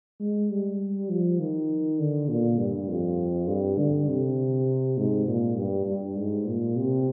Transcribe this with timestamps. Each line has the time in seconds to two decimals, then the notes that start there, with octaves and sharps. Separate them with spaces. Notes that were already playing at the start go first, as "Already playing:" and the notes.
0.20 G#3
0.50 G3
1.09 F3
1.40 D#3
1.99 D3
2.29 A#2
2.58 G2
2.88 F2
3.47 G2
3.78 D3
4.08 C3
4.97 G#2
5.27 A#2
5.56 G2
5.86 G2
6.16 G#2
6.46 A#2
6.76 C3